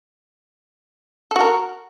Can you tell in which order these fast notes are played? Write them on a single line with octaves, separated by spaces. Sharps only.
A4 F#4 A#4